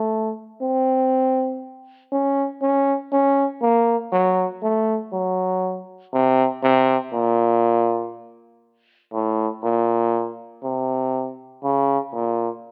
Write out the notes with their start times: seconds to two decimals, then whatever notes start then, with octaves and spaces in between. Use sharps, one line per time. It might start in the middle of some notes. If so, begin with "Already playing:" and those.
Already playing: A3
0.62 C4
2.12 C#4
2.62 C#4
3.12 C#4
3.62 A#3
4.12 F#3
4.63 A3
5.13 F#3
6.13 C3
6.63 C3
7.13 A#2
9.13 A2
9.63 A#2
10.64 C3
11.64 C#3
12.14 A#2